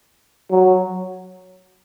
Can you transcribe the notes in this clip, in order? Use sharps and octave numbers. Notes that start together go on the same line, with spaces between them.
F#3